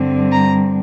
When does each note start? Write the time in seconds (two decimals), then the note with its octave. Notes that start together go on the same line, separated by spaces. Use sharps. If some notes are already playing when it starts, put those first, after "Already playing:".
Already playing: G2 D3 G3 C4
0.33 A#5